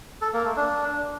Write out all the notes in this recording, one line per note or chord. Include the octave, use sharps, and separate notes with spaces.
A4
A#3
A3
D4